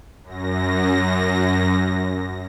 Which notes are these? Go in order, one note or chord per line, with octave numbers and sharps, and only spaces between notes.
F#2 A#6